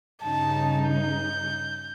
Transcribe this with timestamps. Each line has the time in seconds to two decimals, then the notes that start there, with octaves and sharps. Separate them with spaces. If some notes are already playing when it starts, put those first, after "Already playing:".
0.23 G2 C#3 D#4 A5
0.89 G6